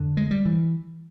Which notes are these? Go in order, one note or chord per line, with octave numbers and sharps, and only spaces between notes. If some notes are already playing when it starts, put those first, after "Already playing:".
Already playing: F2 D3
G#3
G3
E3